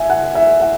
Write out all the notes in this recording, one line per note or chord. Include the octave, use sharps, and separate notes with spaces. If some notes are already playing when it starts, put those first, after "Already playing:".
Already playing: E5 G#5
F#5
E5
F#5